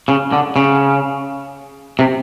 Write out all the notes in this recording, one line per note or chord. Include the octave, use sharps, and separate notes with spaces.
C#3
D3
C#3
C3